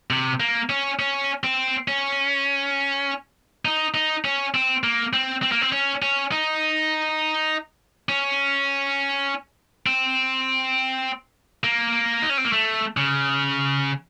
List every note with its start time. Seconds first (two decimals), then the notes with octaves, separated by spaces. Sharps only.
0.10 C3
0.40 A#3
0.70 C#4
0.99 C#4
1.44 C4
1.88 C#4
3.65 D#4
3.94 D#4
4.25 C#4
4.54 C4
4.84 A#3
5.13 C4
5.42 C4
5.52 A#3
5.62 C4
5.72 C#4
6.02 C#4
6.32 D#4
8.09 C#4
9.86 C4
11.64 A#3
12.22 D#4
12.30 C#4
12.38 C4
12.45 A#3
12.53 A3
12.97 C#3